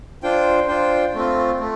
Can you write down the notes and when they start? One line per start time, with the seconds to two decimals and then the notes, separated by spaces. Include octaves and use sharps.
0.23 D4 F4 C5 G5
0.68 D4 F4 C5 G5
1.14 A3 C4 F4
1.60 A3